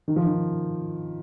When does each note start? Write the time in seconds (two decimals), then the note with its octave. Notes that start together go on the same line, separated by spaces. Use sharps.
0.08 D#3
0.16 F3
0.27 D#3